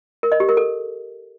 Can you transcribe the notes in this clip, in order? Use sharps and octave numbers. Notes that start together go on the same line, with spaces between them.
A#4
D#5
G4
A#4
A4